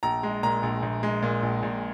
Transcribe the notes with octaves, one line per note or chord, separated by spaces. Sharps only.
A#1 A#5
G#3
A#2 A#5
A#1
A#1
G#3
A#2
A#1
A#1